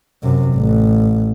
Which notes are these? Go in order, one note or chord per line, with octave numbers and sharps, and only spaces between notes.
F#2 C3
A1